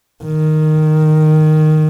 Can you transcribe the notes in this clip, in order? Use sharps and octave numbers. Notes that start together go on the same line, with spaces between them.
D#3